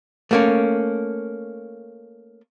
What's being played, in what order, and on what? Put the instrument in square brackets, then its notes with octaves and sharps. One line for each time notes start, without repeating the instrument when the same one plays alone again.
[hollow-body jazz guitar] A3 A#3 C#4